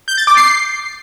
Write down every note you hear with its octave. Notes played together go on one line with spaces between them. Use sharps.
G6
A6
D6
C7